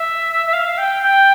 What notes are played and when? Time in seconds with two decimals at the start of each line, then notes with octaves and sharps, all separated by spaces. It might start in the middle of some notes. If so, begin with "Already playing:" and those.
Already playing: E5
0.46 E5
0.53 F5
0.78 G5
1.03 G5